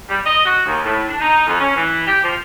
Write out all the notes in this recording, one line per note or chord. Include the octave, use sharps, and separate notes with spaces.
G3
D#5
F#4
D#2
A2
D4
D#4
F2
C#4
E3
G4
F3